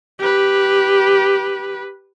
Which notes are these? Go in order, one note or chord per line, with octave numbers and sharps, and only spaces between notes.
G4 B4